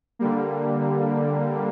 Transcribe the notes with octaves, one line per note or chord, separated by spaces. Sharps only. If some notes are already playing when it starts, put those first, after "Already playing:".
D3 G3 A#3